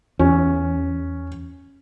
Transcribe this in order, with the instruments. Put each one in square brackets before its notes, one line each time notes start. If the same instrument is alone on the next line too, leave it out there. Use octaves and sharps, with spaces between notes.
[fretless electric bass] E2 [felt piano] C#4